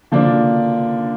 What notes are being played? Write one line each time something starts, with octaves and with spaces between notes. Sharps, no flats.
D3 F3 A#3 D4